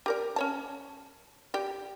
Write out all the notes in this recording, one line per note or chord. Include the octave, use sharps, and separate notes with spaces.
G4 A#4 D5
C#4 C#5 A5
G4 D5